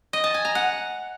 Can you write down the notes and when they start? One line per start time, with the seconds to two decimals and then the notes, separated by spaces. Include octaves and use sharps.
0.13 D#5
0.24 A5
0.34 G#5
0.45 A#5
0.55 F#5